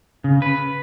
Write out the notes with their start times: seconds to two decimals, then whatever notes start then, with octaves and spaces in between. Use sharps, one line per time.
0.24 C#3
0.42 B4